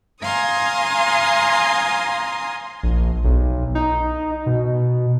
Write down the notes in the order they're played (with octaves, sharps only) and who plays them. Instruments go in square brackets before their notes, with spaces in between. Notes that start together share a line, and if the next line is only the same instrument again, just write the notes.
[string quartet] F5 G#5 A#5 C6 D#6
[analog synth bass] A#1
B1
D#4
B2